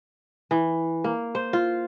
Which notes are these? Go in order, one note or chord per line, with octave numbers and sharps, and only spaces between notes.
E3
A#3
C5
F4